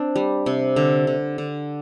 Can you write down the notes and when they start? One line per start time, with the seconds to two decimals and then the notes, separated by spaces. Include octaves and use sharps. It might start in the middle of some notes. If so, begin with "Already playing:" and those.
Already playing: C4 D4
0.16 G3
0.46 C3
0.76 D3
1.07 D3
1.38 D3